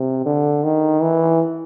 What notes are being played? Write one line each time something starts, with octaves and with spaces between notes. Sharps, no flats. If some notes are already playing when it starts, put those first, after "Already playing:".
Already playing: C3
D3
D#3
E3